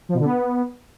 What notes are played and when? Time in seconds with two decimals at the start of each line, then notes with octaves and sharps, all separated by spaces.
0.09 F3
0.14 B2
0.20 D3
0.25 B3